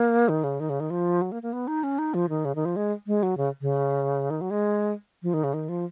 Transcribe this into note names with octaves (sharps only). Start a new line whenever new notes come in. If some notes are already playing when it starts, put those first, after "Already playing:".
Already playing: A#3
D#3
C#3
D#3
C#3
D#3
F3
F#3
A#3
A#3
B3
D#4
C#4
D#4
F3
D#3
C#3
D#3
F3
G#3
G#3
F#3
C#3
C#3
D#3
F#3
G#3
F3
D#3
C#3
D#3
F3